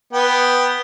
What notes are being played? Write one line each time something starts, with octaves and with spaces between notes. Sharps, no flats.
B3 G5